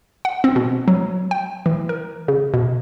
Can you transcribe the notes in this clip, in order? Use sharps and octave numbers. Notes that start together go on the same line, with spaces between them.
F#5
C4
B2
F#3
G5
E3
A#4
C#3
B2